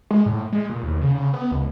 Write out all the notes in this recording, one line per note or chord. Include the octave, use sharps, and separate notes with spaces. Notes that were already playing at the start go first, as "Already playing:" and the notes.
G#3
A2
G#3
A#2
D#2
C#3
C#3
B3
C#2